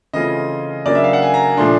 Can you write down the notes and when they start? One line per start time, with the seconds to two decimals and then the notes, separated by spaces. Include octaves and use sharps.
0.13 C#3 E3 A3 C4 F4 D#5
0.86 C#3 F#3 A#3 D4 D5
0.95 E5
1.04 F5
1.13 F#5
1.22 G#5
1.34 A#5
1.57 A#2 F3 A3 D4 C6